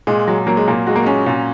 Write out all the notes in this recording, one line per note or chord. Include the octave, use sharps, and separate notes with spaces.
A#2 G#3
F#3
F#3 A#3
G#3
A#2 A#3
G#3 F#4
A#3
G#3 C#4
A#2